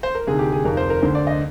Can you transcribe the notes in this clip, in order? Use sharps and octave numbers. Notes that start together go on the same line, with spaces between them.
C5
A#4
D2 C3 D#3 G#4
G4
G#4
F1 F2 D#3 A#4
C5
A#4
D2 D3 C5
D5
D#5